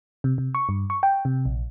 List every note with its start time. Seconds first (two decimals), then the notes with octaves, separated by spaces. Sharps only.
0.24 C3
0.38 C3
0.55 C#6
0.69 G2
0.90 C#6
1.03 G5
1.25 C3
1.45 A#1